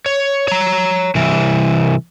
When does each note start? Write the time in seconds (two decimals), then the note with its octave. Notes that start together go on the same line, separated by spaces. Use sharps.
0.06 C#5
0.48 C#5 A#5
1.15 C2 E3